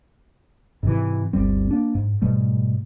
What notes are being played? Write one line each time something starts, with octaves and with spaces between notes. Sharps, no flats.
G#2 C3 E3
G1 D2 G3 C4
A#3 D4
G#2
G#2 B2 G3 A3